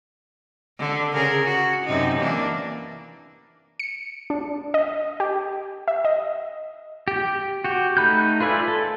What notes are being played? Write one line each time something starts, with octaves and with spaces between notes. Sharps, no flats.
D3
C#3 G#4 A#4
F#4
F#2 C3 D#4
E3 A#3 D4
C#7
D4
D#5
G4
E5
D#5
G4
F#4 G4
A3 D#4 B5 F#6 G6
F4 B4 D5 E5 G#5
A4